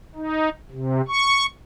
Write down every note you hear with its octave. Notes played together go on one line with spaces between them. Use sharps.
D#4
C3
C#6